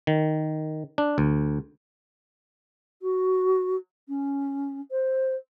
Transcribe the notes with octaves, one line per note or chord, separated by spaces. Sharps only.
D#3
D4
D2
F#4
C#4
C5